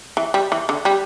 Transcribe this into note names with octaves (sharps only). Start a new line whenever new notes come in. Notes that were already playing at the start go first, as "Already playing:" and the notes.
E3
G3
E3
D3
G3